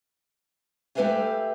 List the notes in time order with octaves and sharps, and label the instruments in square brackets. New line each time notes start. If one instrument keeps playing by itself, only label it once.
[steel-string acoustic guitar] A3 G4 B4 E5 F5 G#5